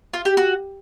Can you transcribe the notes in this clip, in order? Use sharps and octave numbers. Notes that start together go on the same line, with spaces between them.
F4
G4
F#4